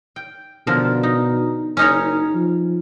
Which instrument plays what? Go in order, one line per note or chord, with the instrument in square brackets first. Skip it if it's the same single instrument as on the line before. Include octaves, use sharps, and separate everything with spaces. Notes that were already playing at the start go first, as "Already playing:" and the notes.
[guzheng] G5
[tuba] B2 [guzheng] D3 F3 A#4
[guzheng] D#4
[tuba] F#1 [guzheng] C#4 D#4 C#5
[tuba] F3